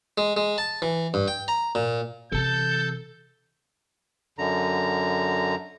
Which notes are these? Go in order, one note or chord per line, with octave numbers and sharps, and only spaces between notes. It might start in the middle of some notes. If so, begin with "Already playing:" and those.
G#3
G#3
A5
E3
G2
G5
A#5
A#2
C3 E3 A4 A5 G6
F#2 D3 A#5